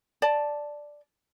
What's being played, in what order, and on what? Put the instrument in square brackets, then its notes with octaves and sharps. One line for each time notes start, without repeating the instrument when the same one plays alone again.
[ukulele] D5 A5